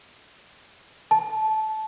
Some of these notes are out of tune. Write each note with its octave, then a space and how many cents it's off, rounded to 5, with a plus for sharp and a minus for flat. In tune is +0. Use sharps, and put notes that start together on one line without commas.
A5 -20